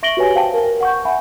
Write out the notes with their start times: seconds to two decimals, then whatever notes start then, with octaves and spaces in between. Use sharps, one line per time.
0.03 E5 C#6 A#6 D7 F#7 G7
0.17 F#4 G4 B4 C#5 G#5
0.35 C5 F5 G5 A5
0.54 A#4
0.81 F#5 C#6 G6
1.05 E5 F#5 G#5 B5